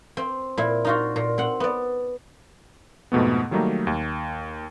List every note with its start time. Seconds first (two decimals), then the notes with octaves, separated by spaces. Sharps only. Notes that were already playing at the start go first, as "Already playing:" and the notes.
0.17 C4
0.57 A#2 E4
0.85 D#4 F4 F#4
1.16 A#2
1.38 C4 F#5
1.60 B3 D5
3.12 F2 G#2 B2 A3 B3
3.51 D#3 F#3 G3 A3 A#3 D#4
3.87 D#2